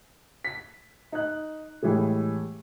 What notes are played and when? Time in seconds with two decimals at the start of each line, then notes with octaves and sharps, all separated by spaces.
0.45 B6
1.12 D#4 F#6
1.83 A2 E3 G3 G#3